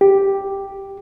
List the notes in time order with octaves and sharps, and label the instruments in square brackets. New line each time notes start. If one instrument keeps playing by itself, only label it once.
[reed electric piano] G4